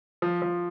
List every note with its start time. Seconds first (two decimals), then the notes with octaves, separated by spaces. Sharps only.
0.22 F3
0.42 F3